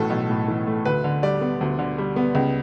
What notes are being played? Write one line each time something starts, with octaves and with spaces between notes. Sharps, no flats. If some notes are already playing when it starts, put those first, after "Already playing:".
Already playing: B1 A2 E3 A3 F#4 A4
B1
A2
E3
A3
D2 B4
D3
G3 D5
B3
D2
D3
G3
B3
C#2